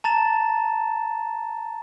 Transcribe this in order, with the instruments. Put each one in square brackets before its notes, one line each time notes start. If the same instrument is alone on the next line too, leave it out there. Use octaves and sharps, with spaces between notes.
[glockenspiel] A5 A#5 A6 E7